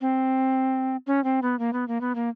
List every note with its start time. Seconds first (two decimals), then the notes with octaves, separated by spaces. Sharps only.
0.01 C4
1.07 C#4
1.24 C4
1.42 B3
1.59 A#3
1.73 B3
1.88 A#3
2.01 B3
2.15 A#3